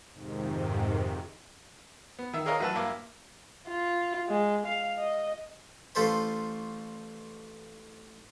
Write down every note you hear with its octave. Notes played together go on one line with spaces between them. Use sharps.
F2 G#2 C3 D#3
B3
D#3 E5
G#4 A#4 C#5 D#5 F5 A#5
A1 F#3 F#4 B4 E5 A5
G2 A#3 E5 D6
F4
G#3
F5
D#5
A1 F4 A4 C5 B5